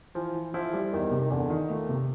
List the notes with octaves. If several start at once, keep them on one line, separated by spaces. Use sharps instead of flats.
E3 F3
E3
F3 E4
G3
E2 D#3
C3
D#3
E2 D3
D#3
A#2 A3
C3